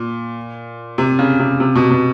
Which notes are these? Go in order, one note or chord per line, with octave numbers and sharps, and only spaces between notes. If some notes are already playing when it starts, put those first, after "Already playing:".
Already playing: A#2
C3
C#3
C3
C3
B2
B2